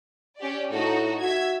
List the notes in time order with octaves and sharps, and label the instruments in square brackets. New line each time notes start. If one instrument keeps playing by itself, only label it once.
[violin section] C#4 G4 D5
[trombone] A2 [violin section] D#4 F#4 A4
[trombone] F#4 [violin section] E5 G#6